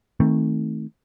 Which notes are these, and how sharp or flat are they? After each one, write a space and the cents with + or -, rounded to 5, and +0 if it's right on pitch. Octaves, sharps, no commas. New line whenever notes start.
D#3 +30 A3 +0 C4 +10